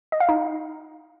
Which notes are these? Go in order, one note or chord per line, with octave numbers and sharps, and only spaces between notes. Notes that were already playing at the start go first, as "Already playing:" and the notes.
D#5
F5
D#4